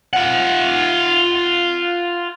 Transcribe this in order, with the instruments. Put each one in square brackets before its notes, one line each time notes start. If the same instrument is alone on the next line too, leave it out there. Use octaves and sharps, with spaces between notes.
[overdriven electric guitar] F4 F#5